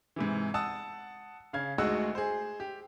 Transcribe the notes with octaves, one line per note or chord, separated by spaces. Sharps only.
G#2 C3 E3
F#5 A5 D#6 E6
C#3 F5 G#6
D2 G#3 D#4 F#4 F#5 E6
G#4 C5
G4